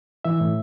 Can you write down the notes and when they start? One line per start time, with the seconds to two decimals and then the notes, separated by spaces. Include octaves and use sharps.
0.25 E3 E5
0.41 A2